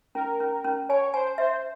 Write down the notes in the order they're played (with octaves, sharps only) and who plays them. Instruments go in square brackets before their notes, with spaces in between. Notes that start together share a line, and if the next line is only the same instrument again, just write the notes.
[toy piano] C#4 [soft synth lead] A#4
[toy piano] C#4
C#4
[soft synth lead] C#5 [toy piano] G#5
[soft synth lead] C5 [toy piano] G#5
[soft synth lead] C5 [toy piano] E5